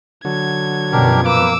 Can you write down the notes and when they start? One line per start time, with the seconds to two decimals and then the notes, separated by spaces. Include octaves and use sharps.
0.25 D3 F#3 G#6
0.92 F#2 B2 F3 D4 G4 A#4
1.25 A#3 B4 D6 E6